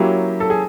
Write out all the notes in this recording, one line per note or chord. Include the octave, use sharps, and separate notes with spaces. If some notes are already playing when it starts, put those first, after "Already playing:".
Already playing: F#3 A#3 C#4 E4 G4
A4
G#4